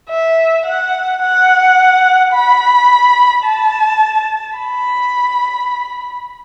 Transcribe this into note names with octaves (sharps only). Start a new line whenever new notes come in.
E5
F#5
F#5
B5
A5
B5